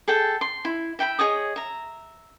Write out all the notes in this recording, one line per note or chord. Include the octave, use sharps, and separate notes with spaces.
G#4 A4 G5 A5
C6
E4
E5 G5 A#5 B5
G#4 C#5 D#5 D#6
E5 A#5